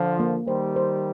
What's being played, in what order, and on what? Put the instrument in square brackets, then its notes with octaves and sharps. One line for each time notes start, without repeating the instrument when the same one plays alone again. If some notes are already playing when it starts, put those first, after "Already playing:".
Already playing: [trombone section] D3 F3
[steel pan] A#3
[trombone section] D#3 G3 [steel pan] C5
[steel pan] C5